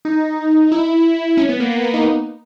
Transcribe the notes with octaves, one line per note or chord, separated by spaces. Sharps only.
D#4
E4
C#4
B3
A#3
B3
B3
D#4